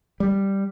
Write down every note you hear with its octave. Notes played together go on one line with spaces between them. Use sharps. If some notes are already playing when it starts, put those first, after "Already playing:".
G3